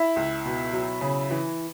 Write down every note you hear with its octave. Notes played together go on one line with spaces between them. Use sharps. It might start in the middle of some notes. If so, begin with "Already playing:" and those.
Already playing: E4
C#2
B2
F#3
C#3
E3